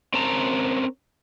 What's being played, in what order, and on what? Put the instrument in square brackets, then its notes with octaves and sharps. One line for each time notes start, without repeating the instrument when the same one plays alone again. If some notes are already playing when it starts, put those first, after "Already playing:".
[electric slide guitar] C4 C#4 A#4 A5 A#5